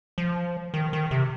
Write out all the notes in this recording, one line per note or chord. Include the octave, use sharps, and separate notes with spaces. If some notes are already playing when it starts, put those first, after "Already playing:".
F3
D#3
D#3
C3